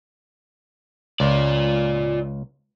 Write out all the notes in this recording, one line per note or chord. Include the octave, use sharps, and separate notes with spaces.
C#2 F4 D5